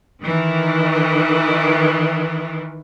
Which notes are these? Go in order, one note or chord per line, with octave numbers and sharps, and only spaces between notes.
D#3 E3